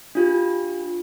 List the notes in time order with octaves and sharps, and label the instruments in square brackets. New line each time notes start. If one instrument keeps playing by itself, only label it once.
[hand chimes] D4 F4 G4